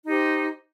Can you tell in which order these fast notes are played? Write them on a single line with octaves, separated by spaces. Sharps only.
D#4 G4 C5